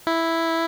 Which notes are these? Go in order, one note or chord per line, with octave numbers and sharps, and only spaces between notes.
E4